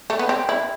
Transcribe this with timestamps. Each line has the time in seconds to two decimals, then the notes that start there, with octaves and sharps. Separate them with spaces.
0.10 A3
0.19 B3
0.29 C4
0.49 E4